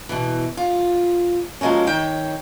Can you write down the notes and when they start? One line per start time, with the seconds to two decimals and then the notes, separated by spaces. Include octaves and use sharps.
0.09 B2 E3
0.57 F4
1.61 F3 F#3 G#3 A#3 C#4
1.87 D#3 C#5 G5